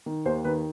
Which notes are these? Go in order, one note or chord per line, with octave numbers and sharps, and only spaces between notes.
D#3
D#2 C5
D#3 B4